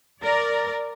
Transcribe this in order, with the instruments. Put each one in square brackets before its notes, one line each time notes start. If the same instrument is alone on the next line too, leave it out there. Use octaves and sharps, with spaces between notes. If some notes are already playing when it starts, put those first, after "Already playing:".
[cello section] A#4 D5